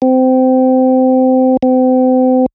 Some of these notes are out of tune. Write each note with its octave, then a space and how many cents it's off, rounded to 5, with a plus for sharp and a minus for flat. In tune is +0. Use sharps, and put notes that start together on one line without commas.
C4 -20
C4 -35